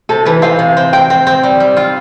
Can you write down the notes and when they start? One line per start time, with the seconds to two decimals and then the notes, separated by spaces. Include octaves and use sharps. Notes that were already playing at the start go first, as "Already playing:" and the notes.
0.09 C3 A4
0.25 E3 B4
0.42 C4 F5
0.59 C3
0.77 C4
0.93 C4 G5
1.10 C4
1.27 C4
1.43 G3
1.60 G3
1.77 F4